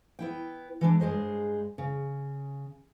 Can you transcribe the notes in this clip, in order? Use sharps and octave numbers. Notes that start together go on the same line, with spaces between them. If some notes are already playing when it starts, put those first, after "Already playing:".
B3 E4 G5
E3 G#3 D4
G2 G#3 G#4 C5 D#5
C#3